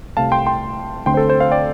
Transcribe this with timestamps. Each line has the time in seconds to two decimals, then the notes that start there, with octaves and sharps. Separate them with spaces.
0.17 C2 C3 A3 F5 A5
0.32 G5 C6
0.47 G5 C6
1.06 D2 D3 A3 C4 G5 C6
1.14 C5
1.17 A4
1.30 C5
1.40 C5 F5
1.51 D5 G5